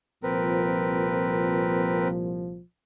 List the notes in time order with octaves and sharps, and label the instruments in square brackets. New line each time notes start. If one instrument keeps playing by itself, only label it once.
[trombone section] C2 A#2 F3 [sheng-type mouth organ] C4 A#4 B4